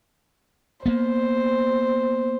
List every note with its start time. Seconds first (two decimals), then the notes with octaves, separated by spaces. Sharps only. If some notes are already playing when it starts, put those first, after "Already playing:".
0.86 A#3 B3 C5